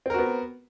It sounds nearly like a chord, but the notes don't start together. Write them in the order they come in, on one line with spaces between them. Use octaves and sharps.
C4 A#4 F#4 B3